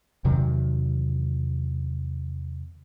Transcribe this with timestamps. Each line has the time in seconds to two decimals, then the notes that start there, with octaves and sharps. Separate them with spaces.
0.25 E2 C3 D#3 F#3